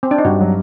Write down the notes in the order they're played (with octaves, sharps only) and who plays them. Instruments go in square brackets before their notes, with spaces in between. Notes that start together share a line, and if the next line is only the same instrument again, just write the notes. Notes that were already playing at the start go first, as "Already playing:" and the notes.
[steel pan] C4
D4
D#4
[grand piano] G2 [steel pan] F#4
[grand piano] F#3